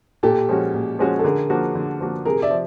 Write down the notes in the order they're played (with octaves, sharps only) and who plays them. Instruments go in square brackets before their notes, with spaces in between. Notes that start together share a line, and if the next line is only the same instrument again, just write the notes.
[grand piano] A#2 [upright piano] G4 A4
[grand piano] F3 G#3 C#4 F#4
A#2
F3 G#3 C#4 F#4
[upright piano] A4
[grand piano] D3 [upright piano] G#4 A#4
[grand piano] F3 A#3 D4 F#4
D3
F3 A#3 D4 F#4
[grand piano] C3 [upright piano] G#4 A#4
[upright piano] D5 E5
[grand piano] F3